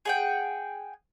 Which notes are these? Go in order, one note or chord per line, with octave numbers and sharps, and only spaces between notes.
G#4 F#5 G5